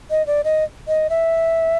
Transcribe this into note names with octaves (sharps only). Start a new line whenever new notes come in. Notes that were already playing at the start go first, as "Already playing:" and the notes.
D#5
D5
D#5
D#5
E5